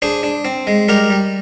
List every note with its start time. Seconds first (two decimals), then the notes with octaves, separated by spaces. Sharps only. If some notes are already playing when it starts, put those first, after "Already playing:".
0.02 D4 G#4 C5
0.23 D4
0.45 C4
0.67 G#3
0.88 G3 G4 A#4
1.10 G3